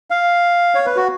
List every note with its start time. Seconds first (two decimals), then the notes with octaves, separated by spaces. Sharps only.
0.10 F5
0.75 C#5
0.86 B4
0.96 F#4